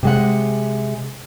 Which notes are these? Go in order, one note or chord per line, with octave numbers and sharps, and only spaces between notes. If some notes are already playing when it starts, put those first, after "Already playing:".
C3 G#3 F#5